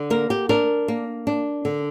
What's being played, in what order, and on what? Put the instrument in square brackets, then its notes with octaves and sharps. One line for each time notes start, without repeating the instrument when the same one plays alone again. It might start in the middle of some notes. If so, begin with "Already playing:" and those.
Already playing: [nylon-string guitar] D3
A#3 A#4
G4
D4 A#4
A#3
D4
D3